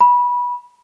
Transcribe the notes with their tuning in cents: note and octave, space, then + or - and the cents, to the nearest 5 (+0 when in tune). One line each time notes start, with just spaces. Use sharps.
B5 -20